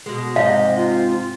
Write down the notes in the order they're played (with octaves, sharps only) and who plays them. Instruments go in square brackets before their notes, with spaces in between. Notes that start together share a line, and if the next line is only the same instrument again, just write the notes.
[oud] B2 G#3
[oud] G#2 C3 [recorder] D#5 [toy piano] F5
[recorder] F4